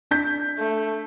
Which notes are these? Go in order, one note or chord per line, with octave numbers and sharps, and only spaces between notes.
D4 G6 B6
A3